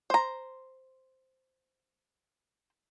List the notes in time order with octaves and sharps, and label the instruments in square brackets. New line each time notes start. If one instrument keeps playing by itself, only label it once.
[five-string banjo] C5 A#5